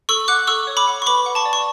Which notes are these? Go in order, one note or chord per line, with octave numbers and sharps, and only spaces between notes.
A4 C#6 E6
F#5 D6 F#6
A4 C#6 E6
C#5
B5 D6
F#5
C#6
B4 B5 D6
F#5
A5 C#6
D5
C#6